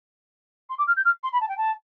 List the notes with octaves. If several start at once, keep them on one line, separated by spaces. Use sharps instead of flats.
C6
D6
F6
G6
F6
C6
B5
A5
G5
A5